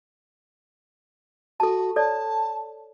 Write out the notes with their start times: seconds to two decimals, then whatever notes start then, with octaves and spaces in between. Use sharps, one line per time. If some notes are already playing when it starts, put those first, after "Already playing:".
1.60 F#4 A4 A5
1.96 A4 C#5 D5 A5